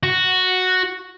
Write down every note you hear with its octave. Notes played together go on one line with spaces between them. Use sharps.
F#4